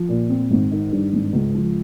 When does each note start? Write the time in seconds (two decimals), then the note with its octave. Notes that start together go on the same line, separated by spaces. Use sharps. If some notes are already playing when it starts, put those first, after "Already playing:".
Already playing: F3
0.09 A#2
0.29 C4
0.51 G#1
0.71 D#3
0.92 G2
1.13 G#1
1.33 C#2
1.55 F3